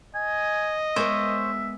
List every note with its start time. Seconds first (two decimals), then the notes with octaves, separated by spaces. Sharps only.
0.15 D#5 G#5
0.96 G#3 B3 A#4 C5 C#5 E5